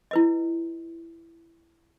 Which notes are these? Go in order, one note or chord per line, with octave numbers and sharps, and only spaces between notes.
E4 B4 D#5